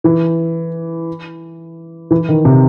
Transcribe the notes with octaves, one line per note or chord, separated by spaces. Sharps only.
E3
E3
D#3
C3